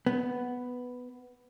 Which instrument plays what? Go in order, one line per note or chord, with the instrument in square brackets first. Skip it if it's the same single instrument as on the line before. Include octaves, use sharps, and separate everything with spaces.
[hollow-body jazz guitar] B3